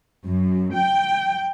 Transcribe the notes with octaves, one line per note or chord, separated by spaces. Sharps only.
F#2
G5